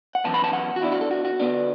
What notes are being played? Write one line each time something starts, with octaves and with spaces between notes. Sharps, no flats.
F#5
F#2 E3 B3 A5
B5
A5
F#5
F#4
E2 E3 D4 E4
F#4
A4
F#4
F#4
D3 B3 D4